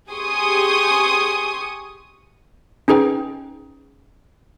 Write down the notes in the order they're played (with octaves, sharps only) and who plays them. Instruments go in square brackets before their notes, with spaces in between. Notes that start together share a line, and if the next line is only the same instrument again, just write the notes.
[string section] G4 G#4 G#5 C6 C#6 D#6
[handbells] C#4 D#4 G#4 B4 G5